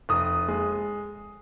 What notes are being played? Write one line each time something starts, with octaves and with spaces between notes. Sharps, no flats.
F1 D#6
G#3